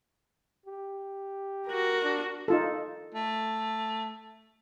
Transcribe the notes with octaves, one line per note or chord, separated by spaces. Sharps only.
G4
F#4 A#4
D4
D#4 F4 A4
A3